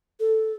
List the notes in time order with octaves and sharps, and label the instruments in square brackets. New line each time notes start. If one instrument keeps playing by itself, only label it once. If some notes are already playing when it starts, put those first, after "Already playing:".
[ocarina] A4